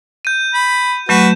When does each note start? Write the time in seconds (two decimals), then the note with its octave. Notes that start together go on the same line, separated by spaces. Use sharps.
0.25 G6 D#7
0.54 B5
1.09 F#3 A3 F#4 B4 G6 E7